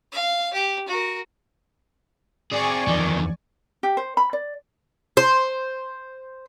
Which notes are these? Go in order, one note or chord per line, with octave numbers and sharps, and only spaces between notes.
F5
G4
F#4 A#4
C4 G#4 D5 G#5 C#6
E2 D#3 F3
G4
C5
B5
D5
C5